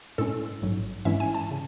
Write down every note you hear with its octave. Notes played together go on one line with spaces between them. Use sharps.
A2 G#3 C#4 A4
A1 G#2 F#3
G#2 E3 G#3 C#4 E4 E5
G#5
A5
C#3